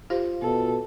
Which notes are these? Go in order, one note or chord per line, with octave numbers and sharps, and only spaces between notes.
F4 G4 C5
B2 A4